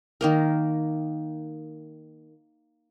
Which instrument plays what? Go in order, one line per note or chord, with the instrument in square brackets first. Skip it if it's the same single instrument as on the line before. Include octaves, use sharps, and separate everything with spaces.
[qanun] D#3 A#3 A#4